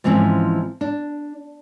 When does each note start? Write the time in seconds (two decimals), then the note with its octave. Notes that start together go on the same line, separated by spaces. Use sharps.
0.04 G#2 E3 F3 C4 C#4
0.81 D4